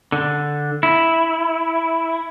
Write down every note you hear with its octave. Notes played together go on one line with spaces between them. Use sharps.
D3
E4